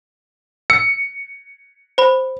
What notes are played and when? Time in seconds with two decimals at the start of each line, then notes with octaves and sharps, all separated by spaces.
0.70 E6 C#7
1.98 C5 B5